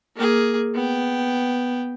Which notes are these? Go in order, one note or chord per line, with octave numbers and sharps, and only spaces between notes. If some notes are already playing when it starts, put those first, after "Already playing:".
A#3 G#4
B3 G5